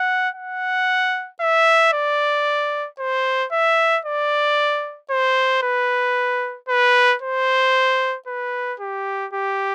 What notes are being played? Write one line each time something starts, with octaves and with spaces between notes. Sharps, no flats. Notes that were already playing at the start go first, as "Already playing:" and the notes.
Already playing: F#5
F#5
E5
D5
C5
E5
D5
C5
B4
B4
C5
B4
G4
G4